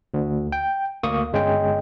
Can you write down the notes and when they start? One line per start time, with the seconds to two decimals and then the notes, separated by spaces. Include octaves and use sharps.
0.14 D2
0.52 G5
1.03 D2 A#3 C#6 D#6
1.33 G1 G#3 C#4 G5